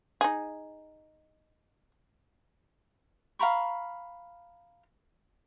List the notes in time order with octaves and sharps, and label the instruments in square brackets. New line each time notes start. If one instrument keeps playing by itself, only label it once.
[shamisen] D#4 G#4
[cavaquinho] F5 A#5 B5 C#6